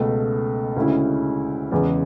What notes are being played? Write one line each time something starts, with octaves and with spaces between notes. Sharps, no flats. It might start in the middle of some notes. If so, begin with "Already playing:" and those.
Already playing: C#2 B2 A3
D2 C#3 G#3 C#4 E4
E2 C#3 G#3